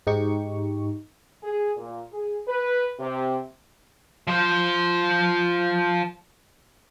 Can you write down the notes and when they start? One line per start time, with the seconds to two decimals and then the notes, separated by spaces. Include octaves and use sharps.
0.07 G#2 D#4 G4 C#6
1.43 G#4
1.77 A#2
2.13 G#4
2.49 B4
2.99 C3
4.27 F3 C5